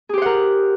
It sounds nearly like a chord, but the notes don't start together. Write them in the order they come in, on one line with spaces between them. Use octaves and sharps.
G#4 G4 C5 F#5 A#4